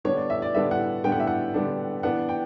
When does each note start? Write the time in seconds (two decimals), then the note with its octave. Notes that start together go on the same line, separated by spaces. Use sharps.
0.05 D3 G3 B3 D4 C#5
0.17 D5
0.30 E5
0.42 D5
0.55 D3 G3 B3 D4 E5
0.71 F#5
1.04 D3 G3 B3 D4 G5
1.12 F#5
1.20 E5
1.27 F#5
1.54 D3 G3 B3 D4
2.03 E3 B3 D4 F#5
2.29 G5